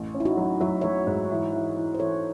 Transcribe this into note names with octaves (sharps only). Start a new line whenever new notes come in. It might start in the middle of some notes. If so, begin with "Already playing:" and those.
Already playing: A1
C#4
E4
D#4 F#4
F#3
F#3 E5
F#3 C#5 E5
G#2
E3
E3
E3
C5
E3 A4 C#5